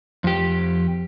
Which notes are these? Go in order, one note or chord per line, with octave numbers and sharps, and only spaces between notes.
F2 G4